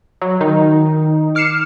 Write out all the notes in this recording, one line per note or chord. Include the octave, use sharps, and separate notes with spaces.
F#3
D#3 D#4
D6 F6 C7 C#7 E7